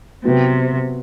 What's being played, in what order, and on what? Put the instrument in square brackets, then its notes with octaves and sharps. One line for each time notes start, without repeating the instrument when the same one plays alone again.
[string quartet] C3 [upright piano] F#3 B3 F#4 B4